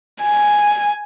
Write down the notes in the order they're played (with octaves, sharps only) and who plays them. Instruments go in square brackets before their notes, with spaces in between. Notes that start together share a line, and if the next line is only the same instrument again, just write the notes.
[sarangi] G#5